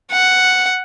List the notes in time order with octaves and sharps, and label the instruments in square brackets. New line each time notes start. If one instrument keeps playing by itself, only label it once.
[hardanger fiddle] F#5